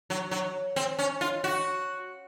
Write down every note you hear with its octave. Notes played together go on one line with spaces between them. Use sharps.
F#3
F#3
C4
C#4
F4
F#4